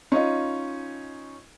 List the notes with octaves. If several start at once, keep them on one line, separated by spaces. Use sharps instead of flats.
C#4 D#4 F4 D#5